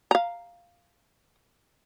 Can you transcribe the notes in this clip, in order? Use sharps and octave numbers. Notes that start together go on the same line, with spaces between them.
F5 A#5